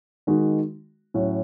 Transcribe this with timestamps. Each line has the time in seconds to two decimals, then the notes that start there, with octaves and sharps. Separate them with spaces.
0.27 D#3 G#3 D#4 F#4
1.14 A2 F#3 C#4 F#4